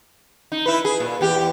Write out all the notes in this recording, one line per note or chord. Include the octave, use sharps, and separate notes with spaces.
D#4
E4 B4
G#4
A#2
E2 G4